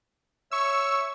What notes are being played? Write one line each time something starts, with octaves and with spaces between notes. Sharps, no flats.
C#5 E5 C#6 E6